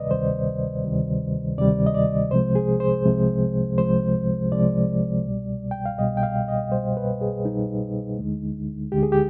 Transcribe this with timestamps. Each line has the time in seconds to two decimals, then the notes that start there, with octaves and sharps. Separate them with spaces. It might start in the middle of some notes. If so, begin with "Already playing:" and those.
Already playing: D2 C3 D#3 G3 B4 D5 D#5
0.11 D2 C3 D#3 G3 C5
0.84 D2 C3 D#3 G3
1.57 D2 C3 D#3 G3 D5
1.86 D#5
1.94 D5
2.31 C2 C3 F3 G#3 C5
2.55 G#4
2.80 C5
3.05 C2 C3 F3 G#3
3.78 C2 C3 F3 G#3 C5
4.51 C2 C3 F3 G#3 D5
5.25 C2 B2 G3
5.71 G5
5.85 F5
5.98 C2 B2 G3 D#5
6.17 G5
6.23 F5
6.48 D#5
6.72 C2 B2 G3 C5
6.97 B4
7.21 G#4
7.45 C2 B2 G3 D#4
8.19 D2 D3 G#3
8.92 D2 D3 G#3 G4
9.03 G#4
9.12 G4